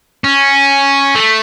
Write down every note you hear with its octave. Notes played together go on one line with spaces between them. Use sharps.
C#4
A3